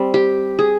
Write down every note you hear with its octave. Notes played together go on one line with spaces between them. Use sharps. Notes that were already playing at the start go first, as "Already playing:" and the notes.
Already playing: G3 C4
G4
G#4